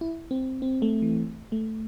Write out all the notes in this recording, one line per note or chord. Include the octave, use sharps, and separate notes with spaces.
E4
C4
C4
A3
E3
A3